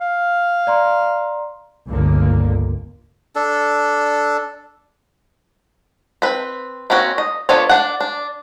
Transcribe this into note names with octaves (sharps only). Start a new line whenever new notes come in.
F5
D5 A#5 C6
G1 C#2 D3 A#3
D4 A4
C4 B4
A#3 C4 C#4 F#4
D#5
F3 B3 D4 A4 C#5
D4 F#5
D4